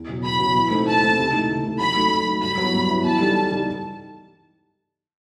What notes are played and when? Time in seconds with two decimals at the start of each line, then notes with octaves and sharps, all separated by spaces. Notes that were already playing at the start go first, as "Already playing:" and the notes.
Already playing: E2
0.09 B2 F#3
0.24 E2 B5
0.39 B2 F#3
0.55 E3
0.71 A3 C4 D#4
0.87 E3 A5
1.03 A3 C4 D#4
1.18 C3
1.33 E3 A3 D#4
1.49 C3
1.64 E3 A3 D#4
1.80 F#3 B5
1.96 A3 D#4 F#4 A4
2.11 F#3
2.27 A3 D#4 F#4 A4
2.42 G2 B5
2.58 F#3 B3 E4
2.74 G2
2.89 F#3 B3 E4
3.04 E3 A5
3.20 G3 D#4 A4
3.36 E3
3.52 G3 D#4 A4